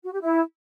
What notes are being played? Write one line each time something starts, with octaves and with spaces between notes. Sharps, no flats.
F#4
G4
E4